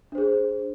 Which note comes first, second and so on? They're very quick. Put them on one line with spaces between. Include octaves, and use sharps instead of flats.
D4 C5 G#4